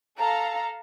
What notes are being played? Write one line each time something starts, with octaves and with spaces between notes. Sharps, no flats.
A4 F5 A#5